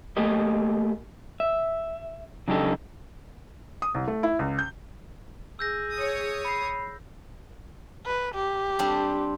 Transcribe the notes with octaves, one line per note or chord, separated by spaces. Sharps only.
A3 A#3 G4 D#5
E5
C#3 F#3 D4 D#4 G4 A4
D#6
C2
A3
E4
C#2
G6
G#4 E6 G6 A#6
C#5 D#6
B5 C7
B4
G4
G3 C4 D4